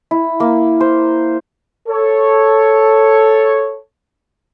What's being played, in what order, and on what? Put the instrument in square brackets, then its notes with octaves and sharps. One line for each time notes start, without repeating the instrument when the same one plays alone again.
[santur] E4
A#3
C5
[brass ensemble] A4 C#5